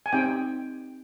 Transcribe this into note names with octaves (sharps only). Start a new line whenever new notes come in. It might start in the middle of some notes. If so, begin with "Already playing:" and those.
G#5
C4 D#4 G4 G5